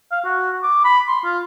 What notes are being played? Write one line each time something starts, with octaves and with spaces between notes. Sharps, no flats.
F5
F#4
D6
B5
C6
F4